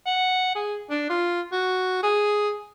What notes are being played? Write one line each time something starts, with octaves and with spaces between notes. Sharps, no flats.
F#5
G#4
D4
F4
F#4
G#4